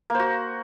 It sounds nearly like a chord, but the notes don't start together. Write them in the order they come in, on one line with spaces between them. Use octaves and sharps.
A#3 C5 F#4